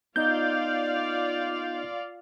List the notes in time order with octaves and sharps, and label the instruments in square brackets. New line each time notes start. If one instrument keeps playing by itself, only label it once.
[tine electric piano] B3 D#4 D#5 [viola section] F4 D5 F5 [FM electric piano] G6